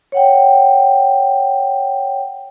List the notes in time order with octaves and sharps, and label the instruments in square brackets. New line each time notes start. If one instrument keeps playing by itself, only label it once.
[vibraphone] C#5 F#5 G5